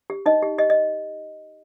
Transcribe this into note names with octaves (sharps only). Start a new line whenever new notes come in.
G4
D#4 D#5
G4
G4 D#5
D#5